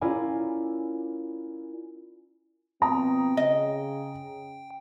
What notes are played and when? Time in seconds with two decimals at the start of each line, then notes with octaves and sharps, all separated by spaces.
0.01 C#4 E4 F4 A#4 D5 G#5
2.82 B2 F3 C4 G5 A#5 D#6
3.37 C#3 D#5